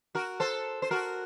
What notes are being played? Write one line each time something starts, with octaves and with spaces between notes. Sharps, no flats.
F#4 A#4
A4 C5
C5
F#4 A#4